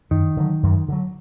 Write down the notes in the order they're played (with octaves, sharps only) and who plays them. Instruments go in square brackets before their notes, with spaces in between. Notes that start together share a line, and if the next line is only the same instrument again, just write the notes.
[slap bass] F#2 [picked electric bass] D#3
[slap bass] D3 F#3
F#2
D3 F#3